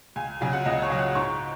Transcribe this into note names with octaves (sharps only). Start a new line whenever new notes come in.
C#2 G#5
C#3 F#3 G#5
F#5
C#2 D#5
C#5
C#3 F#3
F#5
G#2 C#6